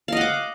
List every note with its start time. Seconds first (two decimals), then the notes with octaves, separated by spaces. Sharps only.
0.08 F5
0.12 D#5
0.17 F#5
0.21 D6